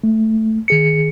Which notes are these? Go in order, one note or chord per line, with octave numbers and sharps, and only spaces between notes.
A3
D#3 G#4 C#7